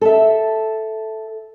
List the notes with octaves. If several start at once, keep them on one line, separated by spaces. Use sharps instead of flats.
A4 E5